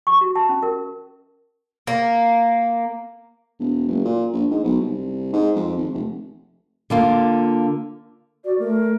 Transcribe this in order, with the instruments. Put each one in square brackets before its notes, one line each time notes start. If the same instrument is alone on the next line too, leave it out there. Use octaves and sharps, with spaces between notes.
[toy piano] C#6
F#4
A5
C#4
A#4
[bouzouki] A#3
[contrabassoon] E1
F#1
A#2
A#1
G#2
B1
C2
G#2
F2
G#1
F1
[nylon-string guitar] D3 A#3 F4
[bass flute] F#4 [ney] D5
[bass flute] A3 [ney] A#4